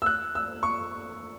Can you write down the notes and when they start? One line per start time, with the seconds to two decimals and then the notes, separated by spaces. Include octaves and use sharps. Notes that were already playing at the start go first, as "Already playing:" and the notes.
0.02 E6
0.06 F#6
0.35 E6
0.63 C#6